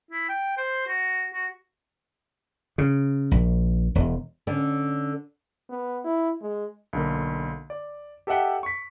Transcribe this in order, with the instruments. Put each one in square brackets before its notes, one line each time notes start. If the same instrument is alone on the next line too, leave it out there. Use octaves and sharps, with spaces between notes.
[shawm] E4
G5
C5
F#4
F#4
[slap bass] C#3
A#1
E1
[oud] D3 C#4
[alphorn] B3
E4
G#3
[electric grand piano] B1 D3 A#3
D5
G4 A4 D#5 E5 F#5 G5
C#6 B6